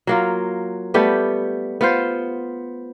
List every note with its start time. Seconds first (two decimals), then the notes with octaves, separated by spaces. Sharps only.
0.07 F#3 A#3 F4
0.94 G3 A3 B3 G4
1.81 B3 F4 C5